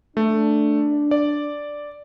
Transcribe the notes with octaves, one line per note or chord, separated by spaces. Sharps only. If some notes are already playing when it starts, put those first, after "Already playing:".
A3 D4
D5